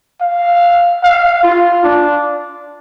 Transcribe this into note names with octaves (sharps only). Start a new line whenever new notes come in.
F5
F5
F4
D4